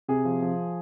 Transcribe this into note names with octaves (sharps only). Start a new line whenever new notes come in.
C3 G#4
F3
F3